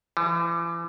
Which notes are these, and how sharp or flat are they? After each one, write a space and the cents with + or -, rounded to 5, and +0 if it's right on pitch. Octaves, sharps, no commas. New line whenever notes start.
E3 +40